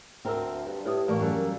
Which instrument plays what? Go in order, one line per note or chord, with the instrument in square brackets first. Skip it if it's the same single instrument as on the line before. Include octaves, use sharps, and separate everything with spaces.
[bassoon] D2 [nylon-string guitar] C4 A#4 [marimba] G5 E6
[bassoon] G2
[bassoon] A2 [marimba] G4 B4 D#6
[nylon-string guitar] A2 [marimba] E3 D5 C#6 [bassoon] A#3
[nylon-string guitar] F#2 G3 A4